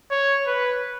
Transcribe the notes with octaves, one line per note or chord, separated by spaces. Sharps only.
C#5
B4